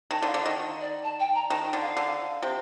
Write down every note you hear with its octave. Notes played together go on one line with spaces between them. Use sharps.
D#3 A5
D3
F5
D3
D#5
D#3
D5
A5
G5
A#5
D#3 A5
G5
D3
F5
D3
C3